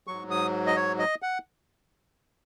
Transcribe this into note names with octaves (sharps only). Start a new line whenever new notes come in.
G#2 F#3 C#6
D#6
D#5
C#5
D#5
F#5